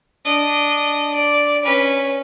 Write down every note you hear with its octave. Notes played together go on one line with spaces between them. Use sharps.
D4 D#5
D5
C#4 B4